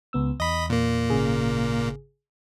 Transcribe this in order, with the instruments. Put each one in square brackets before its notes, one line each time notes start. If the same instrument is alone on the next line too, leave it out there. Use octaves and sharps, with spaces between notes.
[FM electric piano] C#2 B3 E6
[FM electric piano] E2 [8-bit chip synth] D#5 B5
[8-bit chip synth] A#2 A#3
[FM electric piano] G#1 C#3 G#4